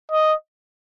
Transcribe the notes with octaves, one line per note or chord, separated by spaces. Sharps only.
D#5